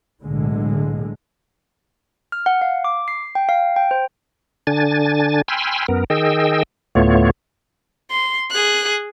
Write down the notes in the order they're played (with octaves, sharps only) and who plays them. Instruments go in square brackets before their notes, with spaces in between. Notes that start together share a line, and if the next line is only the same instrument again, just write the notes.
[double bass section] B1 A2 D3 G#3
[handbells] F6
F#5
F5
D6
C7
G5
F5
G5
C5
[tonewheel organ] D3 D4 G#5 A6
G5 G#5 B5 C6 E6 F6
F#2 B3 A#4
D#3 G#4 D#5 G5 E6
D2 A2 A3 B3 F4 C#5
[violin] C6
G#4 F#6